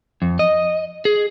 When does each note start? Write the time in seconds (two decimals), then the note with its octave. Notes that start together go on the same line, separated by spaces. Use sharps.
0.22 F2
0.39 D#5
1.05 G#4